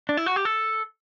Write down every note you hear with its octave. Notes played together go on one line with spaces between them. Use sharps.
D4
E4
F#4
G4
A4